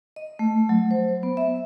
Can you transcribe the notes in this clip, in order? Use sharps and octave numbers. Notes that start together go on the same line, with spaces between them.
D#5
A3
F#3
C5
B3
E5